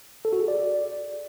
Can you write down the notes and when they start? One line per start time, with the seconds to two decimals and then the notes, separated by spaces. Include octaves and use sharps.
0.25 A4
0.33 F#4
0.40 G#4
0.48 D5